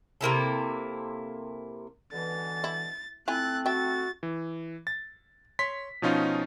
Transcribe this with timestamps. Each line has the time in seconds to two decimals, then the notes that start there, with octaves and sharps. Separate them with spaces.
0.21 C3 A#3 E4 A4
2.12 B2 D3 E3 A6
2.64 E4
3.28 A3 C4 E4 F4 G#5 F#6 A6
3.66 F#4 E5 G5 A6
4.23 E3
4.87 A6
5.59 C#5 C6 B6
6.02 B2 F3 C#4 D#4 F4